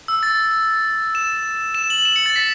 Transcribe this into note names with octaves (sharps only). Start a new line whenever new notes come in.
E6
A6
E7
E7
F#7
E7
C#7
A6
B6